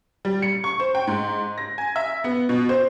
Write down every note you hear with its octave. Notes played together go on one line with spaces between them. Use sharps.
G3
C#7
C#6
C5
G5
G#2
A#6
G#5
E5
B3
B2
C5